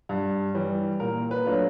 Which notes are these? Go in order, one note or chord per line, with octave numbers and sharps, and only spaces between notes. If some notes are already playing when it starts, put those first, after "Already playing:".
G2
E3 G3
A#2 A#4
B4
F#3 A3 D4 F4